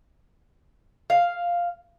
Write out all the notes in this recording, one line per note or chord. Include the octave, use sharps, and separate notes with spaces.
F5